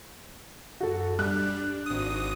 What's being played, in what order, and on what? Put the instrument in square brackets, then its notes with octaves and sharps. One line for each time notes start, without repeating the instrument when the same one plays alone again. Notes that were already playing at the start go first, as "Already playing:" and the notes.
[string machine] F#2 [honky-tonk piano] F#4 A4
[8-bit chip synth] G3 [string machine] D4 [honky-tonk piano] F#6
[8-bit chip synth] G#1 D#6 [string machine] F#4 D6